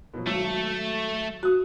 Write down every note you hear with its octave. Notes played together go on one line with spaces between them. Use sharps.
B2 F3 F#3
G#1 F#3 A3 E6
F#4 D#6 F#6